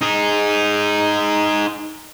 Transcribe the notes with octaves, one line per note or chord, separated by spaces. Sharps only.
D#4 G#4